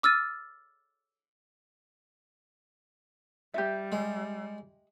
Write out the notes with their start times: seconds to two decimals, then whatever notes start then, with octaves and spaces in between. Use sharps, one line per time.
0.03 D6 E6 F6 A6 D#7
3.54 G3 G4 E5
3.92 G#3